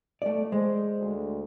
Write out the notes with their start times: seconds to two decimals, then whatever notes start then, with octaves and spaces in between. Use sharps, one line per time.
0.22 A3 D5
0.52 G#3 C5
0.98 D2